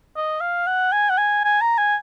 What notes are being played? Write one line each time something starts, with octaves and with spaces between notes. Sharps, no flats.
D#5
F5
F#5
G#5
F#5
G#5
G#5
A#5
G#5